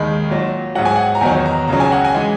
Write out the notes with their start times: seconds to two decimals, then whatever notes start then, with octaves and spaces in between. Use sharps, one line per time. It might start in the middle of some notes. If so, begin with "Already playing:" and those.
Already playing: D#2 D#3 G#3 B5
0.28 A#2 F#3
0.75 G#2 F#3 F#5
0.85 G#5
0.96 F#5
1.15 A#5
1.21 E2 D#3 F#3 G#5
1.45 A#5
1.68 C#2 C#3 F#3 A#5
1.80 G#5
1.92 F#5
2.05 G#5
2.14 E3 G#3